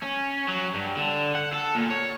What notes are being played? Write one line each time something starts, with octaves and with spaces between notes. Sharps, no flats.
C#4
F#3
G2
D3
F#5
A4
A#2
C#5